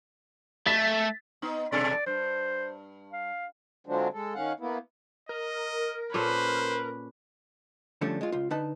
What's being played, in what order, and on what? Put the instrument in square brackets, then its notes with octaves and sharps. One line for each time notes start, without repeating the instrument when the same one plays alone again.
[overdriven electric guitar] A3 [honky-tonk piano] A6 B6
[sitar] B3 D#4
[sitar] G2 B2 A4 [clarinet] D5
[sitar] G2 [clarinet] C5
[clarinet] F5
[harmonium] D3 F3 F#3 G#3 C4 D4
G#3 A4
D#3 C#4 F5 F#5
A#3 B3 E4
[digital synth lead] A#4 [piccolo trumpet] D#5
[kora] A#2 C#4 A4 [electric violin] B4 [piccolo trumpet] C5
[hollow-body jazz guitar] D3 F3 G3 A3 C#4 D4
G#3 F4
C#2 F4
D3 D#4 B4 A5